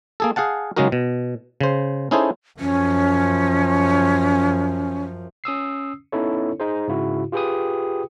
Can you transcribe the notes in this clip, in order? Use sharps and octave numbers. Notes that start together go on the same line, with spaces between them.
A#3 G#4 A4
G#4 F5 F#5 A5
C#3 F#3 G#3 D#4 F#4 A#4
B2
C#3 C5
C#4 D#4 E4 G#4 A4 C5
F#2 F3 C#4
C#4 D#6 E6 C7
B3 C#4 D#4 E4 A4 C#5
D#4 G#4 C5
G#2 C#3 E4 F#4
F4 G4 G#4 B4 G5 D#6